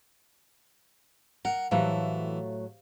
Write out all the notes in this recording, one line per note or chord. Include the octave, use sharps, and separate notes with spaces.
A#4 F#5
A2 E3 F#3 A3 G4 C5 F5